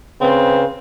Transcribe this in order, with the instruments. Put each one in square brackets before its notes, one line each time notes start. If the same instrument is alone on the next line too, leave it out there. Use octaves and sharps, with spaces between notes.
[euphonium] C#3 [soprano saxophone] C4 [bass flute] B4